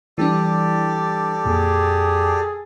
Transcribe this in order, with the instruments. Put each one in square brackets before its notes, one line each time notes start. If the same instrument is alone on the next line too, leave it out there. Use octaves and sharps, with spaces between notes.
[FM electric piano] E3 G3 D4 [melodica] G4 A4 D5
[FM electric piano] F2 A#2 [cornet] G#4